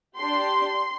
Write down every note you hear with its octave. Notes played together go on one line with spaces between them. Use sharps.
D4 G4 C6